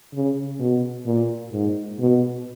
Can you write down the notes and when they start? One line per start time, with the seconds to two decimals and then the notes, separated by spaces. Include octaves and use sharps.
0.14 C#3
0.60 B2
1.06 A#2
1.52 G#2
1.99 B2